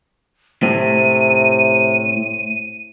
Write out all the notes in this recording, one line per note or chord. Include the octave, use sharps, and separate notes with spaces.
A2 C3 D#7